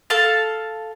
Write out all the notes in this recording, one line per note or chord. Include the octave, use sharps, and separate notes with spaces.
A4 F5 A5